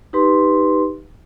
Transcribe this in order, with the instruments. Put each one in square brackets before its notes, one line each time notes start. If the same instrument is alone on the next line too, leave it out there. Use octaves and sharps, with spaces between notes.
[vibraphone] D#4 G4 B4 C6